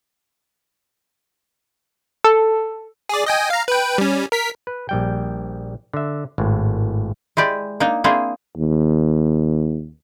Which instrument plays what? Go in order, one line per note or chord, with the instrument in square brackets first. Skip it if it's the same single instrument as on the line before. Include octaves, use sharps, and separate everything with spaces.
[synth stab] A4
[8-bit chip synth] G#4 D5
D#5 G5 G#5
F5 A#5
B4 G5
G3 C#4
A#4 B6
[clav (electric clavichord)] B4
A#1 G3 G5
D3 E5
G#1 A2
[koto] G#3 E4 G4 D5
A#3 D4 D#4 D#5
A#3 C4 D4 E4 G#4 C5
[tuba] D#2